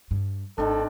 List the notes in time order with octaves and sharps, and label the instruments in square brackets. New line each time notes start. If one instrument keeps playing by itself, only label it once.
[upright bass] G2
[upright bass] G#1 [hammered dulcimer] D#3 C4 D4 [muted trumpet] A4